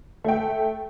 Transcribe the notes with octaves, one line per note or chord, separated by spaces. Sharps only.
A3 G5